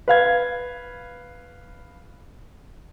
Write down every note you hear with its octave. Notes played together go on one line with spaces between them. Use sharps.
B4 F5 G#6